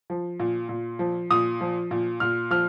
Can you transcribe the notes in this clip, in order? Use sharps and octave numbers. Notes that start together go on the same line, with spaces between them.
F3
A#2
A#2
F3
A#2 D#6
F3
A#2
A#2 F6
F3 F6